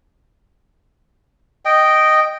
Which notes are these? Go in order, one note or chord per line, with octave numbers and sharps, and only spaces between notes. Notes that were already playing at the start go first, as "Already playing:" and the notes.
D#5 G5